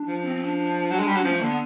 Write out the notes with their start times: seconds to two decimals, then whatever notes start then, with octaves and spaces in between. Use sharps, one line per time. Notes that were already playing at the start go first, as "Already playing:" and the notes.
Already playing: D4
0.08 F3
0.25 C4
0.36 C4
0.43 C#4
0.46 D4
0.58 D4
0.91 F#3
0.99 G#3
1.07 G3
1.15 F#3
1.24 F3 C#4
1.32 A3
1.40 D3 A#3
1.49 B3